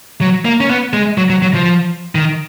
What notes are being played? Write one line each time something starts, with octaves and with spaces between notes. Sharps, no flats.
F#3
A#3
C#4
B3
G#3
F#3
F#3
F#3
F3
D#3